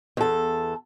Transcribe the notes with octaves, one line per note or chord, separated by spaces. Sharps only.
E2 A4